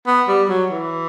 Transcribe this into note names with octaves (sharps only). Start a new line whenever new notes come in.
B3
G3
F#3
E3